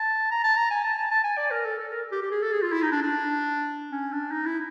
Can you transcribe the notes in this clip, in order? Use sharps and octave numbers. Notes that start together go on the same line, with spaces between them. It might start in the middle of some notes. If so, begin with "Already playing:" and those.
Already playing: A5
A#5
A5
A#5
G#5
A5
A5
A5
G#5
D5
A#4
A4
A4
A#4
G4
G4
G#4
A4
G#4
F4
E4
D#4
D4
D4
C#4
D4
D#4
E4